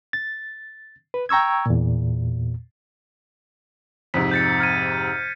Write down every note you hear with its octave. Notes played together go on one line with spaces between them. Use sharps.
A6
B4
G5 A#5 C#6 E6 G#6
E2 A#2
F2 G#2 C3 B6
G6 A6 C#7
F6 G#6 D#7